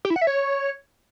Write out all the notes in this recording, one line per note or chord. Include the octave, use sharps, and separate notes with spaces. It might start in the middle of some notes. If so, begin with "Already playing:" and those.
G4
E4
F#5
E5
C#5